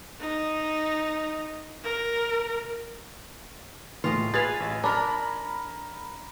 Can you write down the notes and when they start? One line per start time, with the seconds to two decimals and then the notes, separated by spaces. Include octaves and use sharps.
0.20 D#4
1.83 A#4
4.04 A2 E3 F4 D#5
4.34 G#4 B4 F5 G#6 A6 B6
4.60 A1
4.84 D4 A#4 A#5 B5 F6